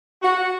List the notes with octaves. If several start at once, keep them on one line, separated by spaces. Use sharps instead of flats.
F#4